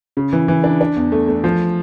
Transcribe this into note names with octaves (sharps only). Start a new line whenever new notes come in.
C#3
E3
E3
D4
D4
E2
A3
A3
F3